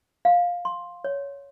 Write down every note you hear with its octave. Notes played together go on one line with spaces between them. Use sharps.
F5
C6
C#5